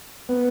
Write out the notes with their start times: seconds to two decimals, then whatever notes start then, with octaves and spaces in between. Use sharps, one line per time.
0.29 B3